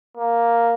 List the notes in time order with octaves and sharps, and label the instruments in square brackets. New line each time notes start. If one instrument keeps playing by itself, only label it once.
[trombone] A#3